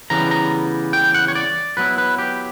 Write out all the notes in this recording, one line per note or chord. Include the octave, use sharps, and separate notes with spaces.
C#3 E3 G3 B3 A#5
A#5
G5
F#5
C#5
D5
F#3 B3 E4 B4
B4
G4